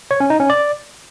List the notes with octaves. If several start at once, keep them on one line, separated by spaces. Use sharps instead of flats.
C#5
C#4
D#4
C#4
D5